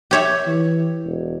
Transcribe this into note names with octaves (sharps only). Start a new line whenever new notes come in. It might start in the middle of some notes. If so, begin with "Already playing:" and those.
G4 C#5 E5
E3
E1